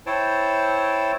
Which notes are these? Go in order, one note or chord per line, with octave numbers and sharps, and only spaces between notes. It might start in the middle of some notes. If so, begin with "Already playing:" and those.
E4 C5 C#5 G5 A5